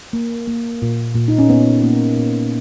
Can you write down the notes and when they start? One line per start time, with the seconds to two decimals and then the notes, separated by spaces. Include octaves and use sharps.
0.13 A#3
0.47 A#3
0.82 A#2
1.15 A#2
1.28 D#4
1.39 C#4
1.49 A#3 B3
1.83 A#3
2.17 A#2